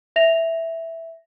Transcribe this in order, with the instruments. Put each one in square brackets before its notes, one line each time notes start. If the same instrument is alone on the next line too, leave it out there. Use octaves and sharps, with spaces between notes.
[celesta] E5 A#6 F7